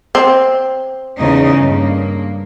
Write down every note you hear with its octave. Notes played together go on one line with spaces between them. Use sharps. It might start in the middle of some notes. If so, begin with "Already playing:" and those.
C4
E2 C#3 D#4
G2 A#3